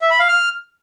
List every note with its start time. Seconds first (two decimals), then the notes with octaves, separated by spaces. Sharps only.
0.01 E5
0.10 B5
0.19 F5
0.28 F6